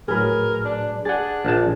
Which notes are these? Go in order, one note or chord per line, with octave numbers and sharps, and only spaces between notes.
A2 F#3 G#4 A#4 B4
D4
D4 G#4 F#5 A6
A#1 A5